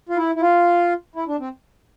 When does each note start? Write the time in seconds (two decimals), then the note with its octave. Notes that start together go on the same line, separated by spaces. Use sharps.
0.09 F4
0.17 E4
0.35 E4
0.41 F4
1.15 E4
1.28 D4
1.40 C4